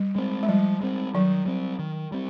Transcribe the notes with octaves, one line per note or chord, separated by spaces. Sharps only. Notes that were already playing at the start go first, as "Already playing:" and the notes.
Already playing: G3
G#3 C4
G#3
F3 G3
G#3 C4
D#3 F#3
G3 C4
D#3
G3 C4